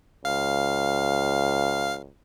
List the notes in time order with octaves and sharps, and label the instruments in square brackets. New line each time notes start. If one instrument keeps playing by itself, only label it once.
[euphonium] C#2 [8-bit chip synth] F5